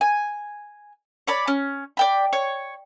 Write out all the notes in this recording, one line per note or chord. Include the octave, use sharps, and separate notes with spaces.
G#5
C#5 D5 B5
C#4
D5 G5 B5
C#5